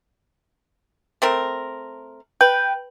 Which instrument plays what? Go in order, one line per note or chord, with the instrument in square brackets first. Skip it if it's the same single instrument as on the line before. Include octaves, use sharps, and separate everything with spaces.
[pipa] A3 C4 A#4
[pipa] B4 [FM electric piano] G5